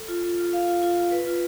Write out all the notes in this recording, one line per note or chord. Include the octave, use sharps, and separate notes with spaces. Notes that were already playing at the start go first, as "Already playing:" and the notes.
Already playing: A4
F4
F4
F4
F5
F4
F4
F4
B4
F4